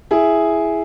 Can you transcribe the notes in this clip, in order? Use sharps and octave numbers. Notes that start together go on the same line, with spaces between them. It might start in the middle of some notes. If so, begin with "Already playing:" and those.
E4 G#4